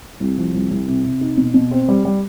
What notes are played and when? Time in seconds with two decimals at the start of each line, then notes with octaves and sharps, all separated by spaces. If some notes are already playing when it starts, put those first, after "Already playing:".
0.20 C2
0.38 F3
0.54 C2
0.71 C2
0.87 C3
1.04 C3
1.21 D#4
1.37 B2
1.54 B2
1.71 C4
1.88 G3
2.05 G3